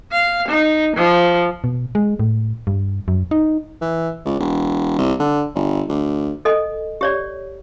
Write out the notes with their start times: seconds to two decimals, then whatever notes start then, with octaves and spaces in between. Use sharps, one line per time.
0.12 F5
0.49 D#4
0.96 F3
1.64 B2
1.95 G#3
2.20 A2
2.67 G2
3.08 F#2
3.31 D#4
3.81 E3
4.25 C#2
4.40 E1
4.98 C2
5.20 D3
5.55 G1
5.89 D2
6.45 A4 D#5 G#5
7.01 G4 C#5 D5